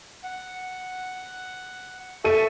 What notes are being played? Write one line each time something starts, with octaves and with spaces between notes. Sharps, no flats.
F#5
A4 E5 C#6 D#7